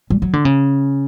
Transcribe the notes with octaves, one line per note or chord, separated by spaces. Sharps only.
G3
F#3
D3
C#3